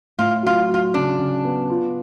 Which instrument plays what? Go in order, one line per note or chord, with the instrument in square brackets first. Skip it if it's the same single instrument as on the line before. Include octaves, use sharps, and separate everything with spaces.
[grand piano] A2 [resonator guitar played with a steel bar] F4
[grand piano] F#3 [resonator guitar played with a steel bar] F4
[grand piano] F#3 [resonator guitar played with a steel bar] F4
[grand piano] C#3 [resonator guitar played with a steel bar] D4
[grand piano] C#3
B3
F4